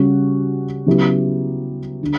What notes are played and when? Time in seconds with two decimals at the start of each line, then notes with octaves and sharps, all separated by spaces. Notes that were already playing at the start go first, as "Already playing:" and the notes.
Already playing: C#3 G3 C#4 F#4
0.86 C#3 F#3 B3 E4 G4
2.03 D3